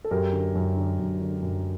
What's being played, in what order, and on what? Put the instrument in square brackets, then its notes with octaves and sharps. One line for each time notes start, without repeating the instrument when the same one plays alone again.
[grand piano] A4
F#2 G4 A#4
D3
F#2
D3
F#2
D3
F#2